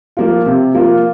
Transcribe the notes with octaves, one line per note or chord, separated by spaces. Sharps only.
F3 A#3 F4
C3
F3 A#3 F4